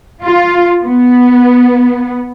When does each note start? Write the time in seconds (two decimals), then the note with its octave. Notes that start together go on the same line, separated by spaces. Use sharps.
0.24 F4
0.86 B3